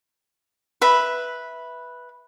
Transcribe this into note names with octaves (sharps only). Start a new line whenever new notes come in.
B4 E5 B5